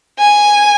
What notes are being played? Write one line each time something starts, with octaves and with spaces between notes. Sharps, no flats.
G#5